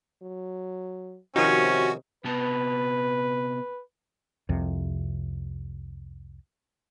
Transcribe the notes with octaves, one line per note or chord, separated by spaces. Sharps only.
F#3
C3 D#3 F3 C#4 D#4 F#4
C3 B3 B4 A5
C2 F2 C3